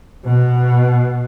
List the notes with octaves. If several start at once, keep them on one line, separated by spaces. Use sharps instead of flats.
B2